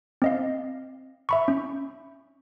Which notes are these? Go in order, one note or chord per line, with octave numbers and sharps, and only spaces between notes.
C4 D#5 F5
E5 B5 C#6
C#4